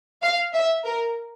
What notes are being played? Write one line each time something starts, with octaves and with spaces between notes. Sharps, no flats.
F5
E5
A#4